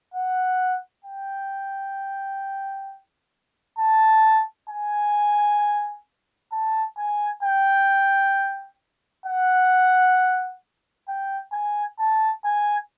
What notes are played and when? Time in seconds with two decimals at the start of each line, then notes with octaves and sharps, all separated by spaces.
0.14 F#5
1.04 G5
3.79 A5
4.69 G#5
6.52 A5
6.98 G#5
7.43 G5
9.26 F#5
11.08 G5
11.53 G#5
11.99 A5
12.45 G#5